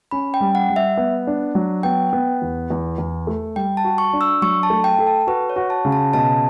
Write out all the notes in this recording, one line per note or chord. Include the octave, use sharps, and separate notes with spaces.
C#4 B5
G5
G3
F#5
G3
E5
B3
D4
F#3
B3 G5
B3
E2
E2
E2
A3
G3 G5
A5
F#4
C#6
D4
E6
F#3 C#6
A5
A3
G5
A4
A5
F#4 B4
C#5
F#4
A5
C#3
A5
B2 A5